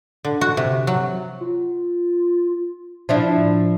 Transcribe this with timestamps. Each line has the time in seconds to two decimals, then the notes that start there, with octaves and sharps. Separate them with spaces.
0.25 D3
0.41 F#4
0.57 C3
0.87 F#3
1.41 F4
3.09 F3 D4 E4 E5
3.37 A2